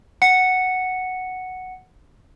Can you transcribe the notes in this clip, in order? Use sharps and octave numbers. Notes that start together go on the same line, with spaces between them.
F#5 C#7